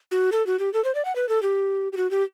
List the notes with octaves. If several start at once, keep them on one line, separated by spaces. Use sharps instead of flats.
F#4
A4
F#4
G4
A4
C5
D5
F#5
B4
A4
G4
G4
F#4
G4